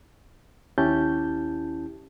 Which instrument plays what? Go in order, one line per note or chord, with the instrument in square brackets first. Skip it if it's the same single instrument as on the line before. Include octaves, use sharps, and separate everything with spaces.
[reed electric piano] D#2 C#4 E4 G4 A5 G6